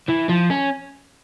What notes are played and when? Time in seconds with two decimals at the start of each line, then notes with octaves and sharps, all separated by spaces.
0.08 E3
0.29 F3
0.50 C#4